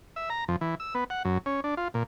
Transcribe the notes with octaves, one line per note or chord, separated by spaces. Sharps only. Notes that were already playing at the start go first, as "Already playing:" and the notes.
E5
A#5
F2
E3
E6
B3
F#5
F#2
C#4
D4
F4
A#2